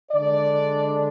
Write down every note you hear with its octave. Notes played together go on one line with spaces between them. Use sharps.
D3 G#3 D4 D5